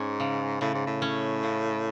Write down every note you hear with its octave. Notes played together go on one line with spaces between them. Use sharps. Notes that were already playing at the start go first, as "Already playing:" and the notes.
Already playing: G#2 C#4
C#3
A2 C#3
G#2
A2
C#4
C#3